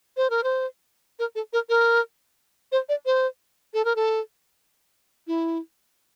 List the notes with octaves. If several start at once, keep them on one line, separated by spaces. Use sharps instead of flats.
C5
A#4
C5
A#4
A4
A#4
A#4
C5
D5
C5
A4
A#4
A4
E4